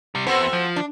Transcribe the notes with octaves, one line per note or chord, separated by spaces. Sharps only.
C3 G3
E2 A3 B3 C4 F#4 C5
F3
D4